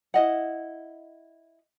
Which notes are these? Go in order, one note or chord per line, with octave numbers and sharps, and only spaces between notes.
E4 D#5 F#5